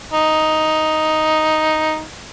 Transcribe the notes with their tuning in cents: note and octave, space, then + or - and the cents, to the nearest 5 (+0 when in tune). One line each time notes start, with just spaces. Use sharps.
D#4 +5